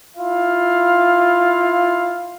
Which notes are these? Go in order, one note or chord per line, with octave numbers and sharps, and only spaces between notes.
E4 F4 F5